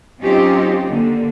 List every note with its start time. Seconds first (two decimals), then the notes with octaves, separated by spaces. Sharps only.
0.21 F#3 C4 C#4 D#4 F4 G4
0.86 D3 A#3